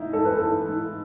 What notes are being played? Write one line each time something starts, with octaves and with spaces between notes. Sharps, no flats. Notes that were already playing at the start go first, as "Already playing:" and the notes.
Already playing: G#2 E3 D#4 E4
G#2 A4
B4
E3 A4
G#2